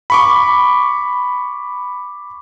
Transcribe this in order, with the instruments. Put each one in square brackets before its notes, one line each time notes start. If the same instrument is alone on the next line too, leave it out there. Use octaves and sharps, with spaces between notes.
[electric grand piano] B5 C#6 D6